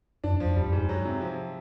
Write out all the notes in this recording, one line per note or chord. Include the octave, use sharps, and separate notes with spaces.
F#2 D4
F2
F3
F2
E2 G3
F2
G#2
G2
F#3
C3
F3